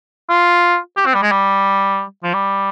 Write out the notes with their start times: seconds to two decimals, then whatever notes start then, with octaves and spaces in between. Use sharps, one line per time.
0.30 F4
0.97 G4
1.06 C4
1.14 G3
1.23 G#3
1.32 G3
2.24 F3
2.34 G3